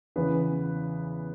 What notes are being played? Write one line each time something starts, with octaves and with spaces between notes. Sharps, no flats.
E2 C#3 E3 B3 B4